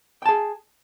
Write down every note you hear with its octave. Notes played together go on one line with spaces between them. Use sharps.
G#4 G5 A5